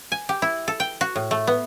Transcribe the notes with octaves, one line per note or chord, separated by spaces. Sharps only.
G#5
G4
E4
A4
G5
F#4
A2
A3
B3